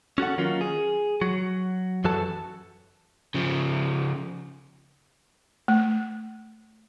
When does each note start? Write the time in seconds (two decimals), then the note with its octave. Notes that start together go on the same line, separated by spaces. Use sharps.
0.18 C#4 F#4 A4 F#5
0.38 D#3 F#3 A#3 C#4 F4
0.61 G#4
1.21 F#3 F#4
2.04 F#2 E3 F#4 A4 A5
3.34 C#3 F3
5.68 A3